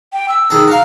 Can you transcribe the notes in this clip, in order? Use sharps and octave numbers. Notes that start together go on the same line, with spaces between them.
G5
E6
D#3 G#4 A4
F#4 F5 A#5